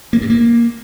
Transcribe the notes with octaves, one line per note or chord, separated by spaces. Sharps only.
A#3
G2
A#3